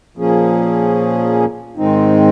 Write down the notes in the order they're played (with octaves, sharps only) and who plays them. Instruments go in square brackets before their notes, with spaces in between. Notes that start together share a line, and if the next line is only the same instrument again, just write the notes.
[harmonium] A#2 F3 A#3 C#4 G#4
G#2 D#3 G#3 C4 D#4